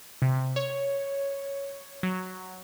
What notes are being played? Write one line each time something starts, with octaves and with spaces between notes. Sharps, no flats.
C3
C#5
F#3